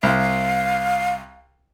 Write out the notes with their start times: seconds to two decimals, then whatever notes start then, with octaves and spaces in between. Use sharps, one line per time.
0.03 C2 F5